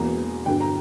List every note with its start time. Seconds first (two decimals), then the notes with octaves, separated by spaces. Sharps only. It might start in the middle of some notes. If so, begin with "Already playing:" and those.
Already playing: E1 E2 B2 A#3 A#5
0.46 G1 G2 F#3 G5
0.60 A#5